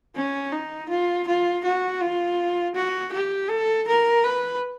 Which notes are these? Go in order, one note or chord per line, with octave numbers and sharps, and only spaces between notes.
C#4
D#4
F4
F4
F#4
F4
F#4
G4
A4
A#4
B4